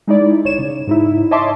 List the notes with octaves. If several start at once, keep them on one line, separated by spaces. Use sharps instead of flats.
G#3 D#4 E4 D5
G1 C#5 E7
C#3
G#2 D#4 E4
C#5 D#5 E5 A5 C6 D6